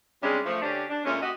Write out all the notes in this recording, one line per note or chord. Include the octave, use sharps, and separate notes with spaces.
C3 G3 G#3 C#4 D4
F3 A3
D3 C#4 D4 G4
D4
A#2 G#3 A3 C#4
F#4 G4 D#5